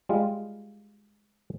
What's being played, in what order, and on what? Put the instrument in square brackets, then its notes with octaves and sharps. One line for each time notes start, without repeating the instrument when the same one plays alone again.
[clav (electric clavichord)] G3 G#3 F4